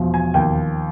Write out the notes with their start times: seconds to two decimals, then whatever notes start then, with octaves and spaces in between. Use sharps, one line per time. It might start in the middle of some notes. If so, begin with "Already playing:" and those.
Already playing: E1 F3
0.14 G#5
0.34 D#2 G5